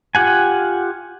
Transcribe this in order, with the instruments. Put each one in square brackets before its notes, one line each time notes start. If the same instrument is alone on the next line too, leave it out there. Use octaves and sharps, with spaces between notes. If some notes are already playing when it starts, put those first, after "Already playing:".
[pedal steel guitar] F4 G4 F#5 G#5